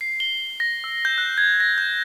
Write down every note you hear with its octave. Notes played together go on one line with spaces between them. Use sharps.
C7
G7
A#6
E6
G6
F#6
G#6
A#6
G6